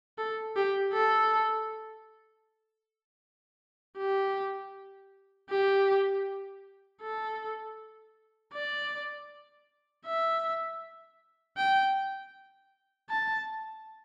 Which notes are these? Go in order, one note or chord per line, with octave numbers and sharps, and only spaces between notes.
A4
G4
A4
G4
G4
A4
D5
E5
G5
A5